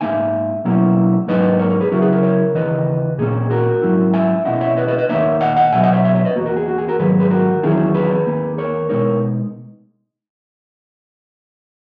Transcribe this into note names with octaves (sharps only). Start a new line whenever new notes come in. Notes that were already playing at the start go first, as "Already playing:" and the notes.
G#2 D#3 A#3 D#4 E5 G#5
B2 F#3 A#3 C#4 E4
G#2 F#3 A#3 D#4 B4 D#5
A#4 C#5
A#4 C#5
G#4 B4
C#3 F#3 C#4 E4 F#4 A#4
G#4 B4
A#4 C#5
A#4 C#5
D#2 C#3 E3 B4 D#5
A#2 A#3 C#4 G#4
F#4 A#4
G#2 F#3 C#4 E4
E5 G#5
B2 A#3 C#4 E4 D#5 F#5
C#5 E5
B4 D#5
B4 D#5
B4 D#5
D#2 D#3 A#3 D#4 C#5 E5
D#5 F#5
D#5 F#5
B2 F#3 B3 E5 G#5
D#5 F#5
C#5 E5
C#5 E5
C#5 E5
B4 D#5
E2 B2 A#3 F#4
F#4 A#4
G#4
F#4
G#4
F#4 A#4
G#2 D#3 F#3 G#4 B4
G#4 B4
F#4 A#4
E2 D#3 F#3 C#4 E4 G#4
G#4 B4
D#2 D#3 A#3
A#4 C#5
B2 G#3 D#4 A#4 C#5